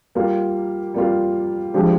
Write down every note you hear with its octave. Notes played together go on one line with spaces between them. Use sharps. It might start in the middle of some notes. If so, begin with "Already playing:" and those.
G3 A#3 F4
G3 A#3 F4
F3 G#3 D4 G4